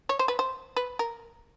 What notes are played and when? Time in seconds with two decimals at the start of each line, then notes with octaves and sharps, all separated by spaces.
0.09 C#5
0.19 C5
0.28 B4
0.39 C5
0.76 B4
0.99 A#4